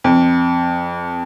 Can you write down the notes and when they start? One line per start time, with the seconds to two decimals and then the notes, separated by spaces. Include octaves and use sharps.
0.04 F2